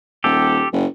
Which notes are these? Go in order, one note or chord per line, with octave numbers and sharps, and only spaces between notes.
D#1 G4 A4
F#1